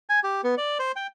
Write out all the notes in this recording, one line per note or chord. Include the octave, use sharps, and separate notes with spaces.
G#5
G4
B3
D5
C5
G5